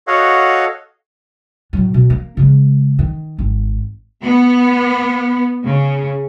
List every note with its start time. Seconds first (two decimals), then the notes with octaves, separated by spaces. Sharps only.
0.07 F#4 A4 C#5 D#5 F5 F#5
1.73 A2 F#3
1.94 B2
2.10 A#3
2.37 C#3 G#3
2.99 D#3
3.38 G#1
4.23 B3
5.64 C#3